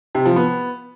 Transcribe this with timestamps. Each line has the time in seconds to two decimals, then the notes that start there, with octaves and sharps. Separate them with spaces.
0.15 C3
0.25 F3
0.36 B3